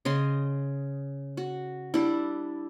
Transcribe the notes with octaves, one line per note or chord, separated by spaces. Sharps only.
C#3 D#5 C6
F#4
G3 D4 E4